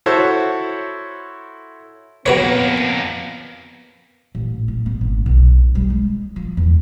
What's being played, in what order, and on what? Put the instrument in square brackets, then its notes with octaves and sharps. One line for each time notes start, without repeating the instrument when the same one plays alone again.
[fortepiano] E4 F#4 A4 C5 C#5
[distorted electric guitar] F2 A#3 [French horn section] B3 [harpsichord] F#4 B4 C#5
[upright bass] A1
A2
B3
G#1
B1
G3
G#3
F3
E2